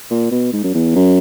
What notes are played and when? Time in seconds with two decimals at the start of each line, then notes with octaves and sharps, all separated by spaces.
0.11 A#2
0.31 B2
0.53 G#2
0.64 F#2
0.74 E2
0.95 F#2